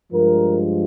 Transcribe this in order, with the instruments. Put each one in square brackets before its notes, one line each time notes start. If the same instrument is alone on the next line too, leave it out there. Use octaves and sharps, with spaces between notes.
[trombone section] G2 F3 G#3 A#4